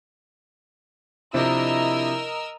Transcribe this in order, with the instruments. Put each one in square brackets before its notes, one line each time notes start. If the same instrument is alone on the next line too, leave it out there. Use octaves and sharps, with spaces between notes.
[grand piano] C3 F3 D4 [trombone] E4 [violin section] A#4 D#5 E6